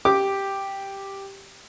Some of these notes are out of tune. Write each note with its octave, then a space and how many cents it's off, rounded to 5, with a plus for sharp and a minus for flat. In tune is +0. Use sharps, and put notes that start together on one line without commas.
G4 +0 D6 +5